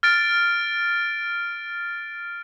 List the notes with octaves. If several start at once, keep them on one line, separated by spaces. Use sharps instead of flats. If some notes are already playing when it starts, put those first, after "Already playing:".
F6 A6 D7